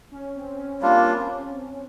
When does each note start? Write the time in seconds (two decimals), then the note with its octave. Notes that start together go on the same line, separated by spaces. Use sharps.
0.12 C#4
0.35 C4
0.58 C#4
0.81 G3 A#3 C#4 D4 F4